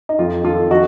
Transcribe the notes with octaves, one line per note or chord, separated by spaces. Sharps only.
D#4
F2 F4
D#3 F4 A4
F3 D#4 F#4